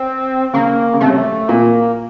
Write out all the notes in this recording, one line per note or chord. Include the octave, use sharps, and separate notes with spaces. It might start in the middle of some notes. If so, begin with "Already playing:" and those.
Already playing: C4
C#3 A#3
C#3
C3 A3
F#3
A3
A#2 A#3